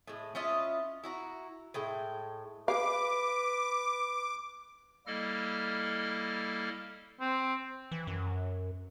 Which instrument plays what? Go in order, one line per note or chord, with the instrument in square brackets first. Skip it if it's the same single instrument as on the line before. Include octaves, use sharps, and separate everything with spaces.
[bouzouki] A2 G#3
C#4 E4 F4 D#5
E4 F#4 A#5
A2 G#3 G5
[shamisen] G#4 F5 [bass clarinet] B4 [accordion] D6
[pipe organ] G3 A#3 E4 A4 D#5 F6
[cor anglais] C4
[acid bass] E3
F#2